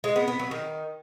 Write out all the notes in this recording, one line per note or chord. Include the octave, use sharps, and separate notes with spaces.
G#3
B3
B3
F#3
D#3